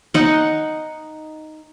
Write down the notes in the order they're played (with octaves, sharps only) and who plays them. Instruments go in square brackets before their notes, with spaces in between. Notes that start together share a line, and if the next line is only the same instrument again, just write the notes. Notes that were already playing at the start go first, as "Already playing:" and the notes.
[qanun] D#4 F#5